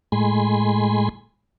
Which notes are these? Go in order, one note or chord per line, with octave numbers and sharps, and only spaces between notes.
A2 G#3 G#5 B5 C6